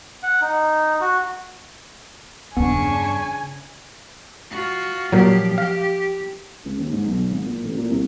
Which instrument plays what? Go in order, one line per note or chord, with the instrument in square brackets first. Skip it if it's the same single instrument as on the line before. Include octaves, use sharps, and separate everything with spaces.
[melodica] F#5
D#4
F#4
[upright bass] E2 G2 [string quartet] C#3 D4 C#6 [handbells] B3 [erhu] G#5
[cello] F4 F#4
[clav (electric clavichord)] A#2 F#3 [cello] F3 G4
[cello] G4 [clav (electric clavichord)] F5
[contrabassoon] C#2
D#2
G#2
B1
G#1
A#2
A1
A#2
C2